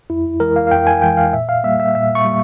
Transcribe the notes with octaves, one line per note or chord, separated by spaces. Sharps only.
F2 E4
E3 G#3 A#4
F5
F5
F2 G5
G#5
E3 G#3 G5
F5
A#2 E5
F5
G3 A#3 E5
E5
A#2 E5
C#6
G3 A#3